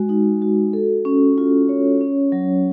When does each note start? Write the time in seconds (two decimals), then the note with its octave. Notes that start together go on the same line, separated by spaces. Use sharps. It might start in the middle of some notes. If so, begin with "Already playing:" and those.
Already playing: G#3 F#4
0.09 D#4
0.42 F#4
0.73 A4
1.05 C#4
1.38 F4
1.69 C#5
2.01 C#4
2.32 F#3